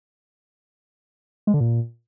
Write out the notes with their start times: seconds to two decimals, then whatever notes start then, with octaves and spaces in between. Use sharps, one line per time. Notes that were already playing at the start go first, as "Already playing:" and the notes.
1.47 G#3
1.54 D3
1.60 A#2